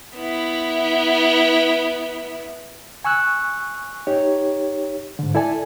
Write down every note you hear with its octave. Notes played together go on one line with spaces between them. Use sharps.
B3 E4
G#5 C#6 E6 F#6
D#4 G4 C#5
G#2 D3
E4 A4 D5 G#5